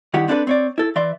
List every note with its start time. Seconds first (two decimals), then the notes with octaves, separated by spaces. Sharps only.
0.14 G2 D#3 E4 G4 F#5
0.28 C4 D4 E4 A4 B4
0.47 C4 C#5 D5
0.78 E4 A4
0.96 E3 D5 E5 C6